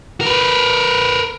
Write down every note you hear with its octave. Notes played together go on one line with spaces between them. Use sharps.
A#4 B4